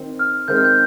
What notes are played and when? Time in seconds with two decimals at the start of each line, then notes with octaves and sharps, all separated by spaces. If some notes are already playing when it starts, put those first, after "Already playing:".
Already playing: D#3 C4
0.19 F6
0.48 D#3 G#3 C4 G6
0.56 F6
0.64 G6